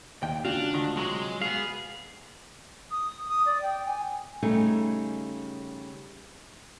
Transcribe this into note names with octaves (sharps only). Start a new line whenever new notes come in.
D#2 G5
C#2 D4 F4 F#4 F5
D2 D3 D#3
C3 F#3 G#3
B3 G#4 F5
D#6
D#6
D5
G5
G#5
C#3 G3 A3 D#4 G#4